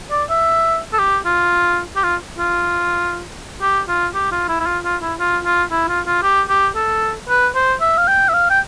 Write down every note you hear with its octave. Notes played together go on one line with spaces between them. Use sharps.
D5
E5
A4
G4
F4
G4
F4
F4
G4
F4
G4
F4
E4
E4
F4
F4
E4
F4
F4
E4
F4
F4
G4
G4
A4
B4
C5
E5
F5
G5
E5
F5
G5